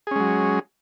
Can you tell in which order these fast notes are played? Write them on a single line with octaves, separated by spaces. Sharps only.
G#4 C#4 G#3 F#3